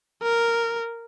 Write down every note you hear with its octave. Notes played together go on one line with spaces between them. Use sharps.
A#4